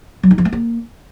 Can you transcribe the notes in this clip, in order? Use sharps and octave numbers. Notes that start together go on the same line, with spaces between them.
F#3
D#4
F3
A3
A#3